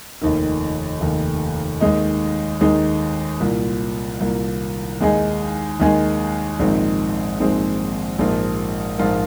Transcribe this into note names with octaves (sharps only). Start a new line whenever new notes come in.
F1 D#2 D#3
F1 D#2 D#3
D#2 D#3 G#3 D#4
D#2 D#3 G#3 D#4
C2 A#2 A#3
C2 A#2 A#3
D#2 D#3 G#3 D#4 G#4
D#2 D#3 G#3 D#4 G#4
A#1 G#2 D#3 G#3 C4
A#1 G#2 D#3 G#3 C4
A#1 G#2 F3 A#3 F4
A#1 G#2 F3 A#3 F4